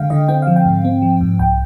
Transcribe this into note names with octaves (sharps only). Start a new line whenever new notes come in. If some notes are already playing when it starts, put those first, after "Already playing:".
Already playing: D3 G#3 F5 G5
D3 D#5
C4 G5
F3 F5
G5
G#2
C4
F3
G#2
C2 G5